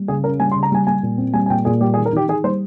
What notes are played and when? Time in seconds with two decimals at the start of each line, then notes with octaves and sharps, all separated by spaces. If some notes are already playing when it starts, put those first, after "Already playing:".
Already playing: G3
0.08 C#3 G#4
0.24 C#4 A#4
0.40 G3 G#5
0.52 C6
0.56 C#3
0.63 A#5
0.72 G3 G#5
0.87 G3 G#5
1.03 A#2
1.18 C4
1.34 G3 G#5
1.46 G#5
1.50 A#2 G5
1.65 A#2 G#4
1.81 G3 G4
1.94 G#4
1.96 D#3
2.06 A#4
2.13 D#3 G4
2.28 D#3 G#4
2.44 G3 C5